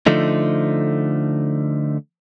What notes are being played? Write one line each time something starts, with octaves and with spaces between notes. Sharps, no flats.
D3 F3 A3 D#4